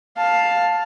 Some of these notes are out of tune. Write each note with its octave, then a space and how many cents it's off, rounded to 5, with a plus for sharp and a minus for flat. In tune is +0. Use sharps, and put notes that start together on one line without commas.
F5 +10 A5 +0